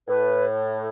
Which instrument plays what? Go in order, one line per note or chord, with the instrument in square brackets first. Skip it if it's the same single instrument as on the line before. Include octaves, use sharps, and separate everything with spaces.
[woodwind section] A2 [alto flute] B4